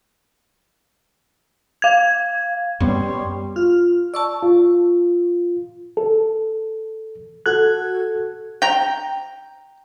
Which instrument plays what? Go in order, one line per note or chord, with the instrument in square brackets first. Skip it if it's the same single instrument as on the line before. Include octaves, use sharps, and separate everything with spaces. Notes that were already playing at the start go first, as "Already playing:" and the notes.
[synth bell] F5 G#6
[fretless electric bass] F#2 B3 [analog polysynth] G3 [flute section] C#5 C6 C#6
[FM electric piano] F4 F6
[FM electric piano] D5 [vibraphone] A5 C#6 E6
[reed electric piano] F4
A4
[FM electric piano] F#4 A4 G#6 [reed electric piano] F#6
[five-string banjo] G5 A#5